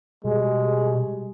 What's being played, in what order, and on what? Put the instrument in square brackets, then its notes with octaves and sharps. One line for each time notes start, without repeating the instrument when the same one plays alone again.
[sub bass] B2 [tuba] G3 [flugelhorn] G#3 [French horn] G#4